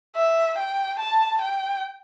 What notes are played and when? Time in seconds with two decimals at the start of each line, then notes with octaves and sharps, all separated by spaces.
0.16 E5
0.58 G5
0.99 A5
1.41 G5